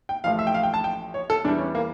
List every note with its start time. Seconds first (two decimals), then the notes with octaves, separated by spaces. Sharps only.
0.09 G5
0.24 A1 A2 F3 F5
0.39 E5
0.47 G5
0.54 F5
0.63 G5
0.74 A5
0.84 G5
1.14 C#5
1.30 A4
1.44 E2 E3 G3 D4
1.58 C#4
1.75 A#3